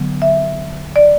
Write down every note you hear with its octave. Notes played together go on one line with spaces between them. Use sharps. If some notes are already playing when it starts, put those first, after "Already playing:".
Already playing: D3 F#3 B3
E5
D5